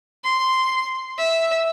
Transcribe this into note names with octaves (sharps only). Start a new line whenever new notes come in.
C6
E5